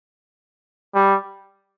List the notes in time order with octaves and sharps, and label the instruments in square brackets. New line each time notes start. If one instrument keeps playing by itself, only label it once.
[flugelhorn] G3